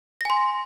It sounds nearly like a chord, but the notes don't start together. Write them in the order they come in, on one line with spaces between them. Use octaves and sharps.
A#6 G#5 C6